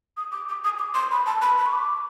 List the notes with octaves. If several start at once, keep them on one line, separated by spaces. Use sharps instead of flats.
D#6
D6
D6
D#6
D6
C6
B5
A5
B5
B5
C#6
D6